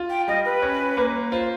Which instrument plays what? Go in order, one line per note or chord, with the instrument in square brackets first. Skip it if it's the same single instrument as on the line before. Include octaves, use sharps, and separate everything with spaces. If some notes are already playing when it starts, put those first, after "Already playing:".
Already playing: [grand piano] F4
[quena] G5
[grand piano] G3 [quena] D#5
[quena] B4
[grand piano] C#4
A#3
[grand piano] F4 [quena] C5